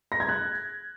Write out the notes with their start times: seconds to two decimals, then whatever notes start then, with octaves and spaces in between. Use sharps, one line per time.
0.12 A#6
0.20 G#6
0.29 F#6